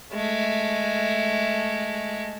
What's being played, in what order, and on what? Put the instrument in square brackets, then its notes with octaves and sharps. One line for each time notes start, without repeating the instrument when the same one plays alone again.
[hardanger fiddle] G#3 A3